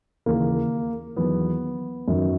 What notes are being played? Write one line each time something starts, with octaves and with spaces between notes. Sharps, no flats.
D#2 C#3 E3 A#3
E2 D#3 F#3 B3
F#2 D#3 F#3